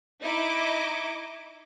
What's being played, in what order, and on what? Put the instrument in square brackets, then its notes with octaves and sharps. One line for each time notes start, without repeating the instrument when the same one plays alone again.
[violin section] D#4 E4 D#5 D6